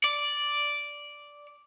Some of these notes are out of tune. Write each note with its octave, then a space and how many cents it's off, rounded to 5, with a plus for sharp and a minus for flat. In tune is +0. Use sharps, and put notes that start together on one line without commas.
D5 -5